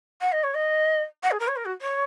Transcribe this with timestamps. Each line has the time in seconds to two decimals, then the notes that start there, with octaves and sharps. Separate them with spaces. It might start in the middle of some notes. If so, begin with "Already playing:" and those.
0.20 F#5
0.32 D#5
0.43 C#5
0.54 D#5
1.22 F#5
1.31 G#4
1.39 A#4
1.47 C#5
1.56 A#4
1.65 F#4
1.81 C#5